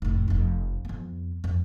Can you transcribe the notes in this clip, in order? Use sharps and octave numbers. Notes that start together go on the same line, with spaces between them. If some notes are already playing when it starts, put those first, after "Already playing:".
F1 A2
F1 F2
F2 B3
F2